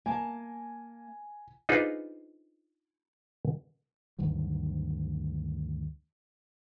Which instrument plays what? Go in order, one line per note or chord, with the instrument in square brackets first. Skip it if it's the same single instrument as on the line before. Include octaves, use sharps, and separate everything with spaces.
[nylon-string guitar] A#3 A5 [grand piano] G#5
[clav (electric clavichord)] D4 D#4 F4 G#4 B4 C5
[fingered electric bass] D2 G2 D#3 F#3